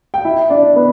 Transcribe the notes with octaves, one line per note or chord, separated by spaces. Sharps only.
G5
E4 E5
D4 D5
B3 B4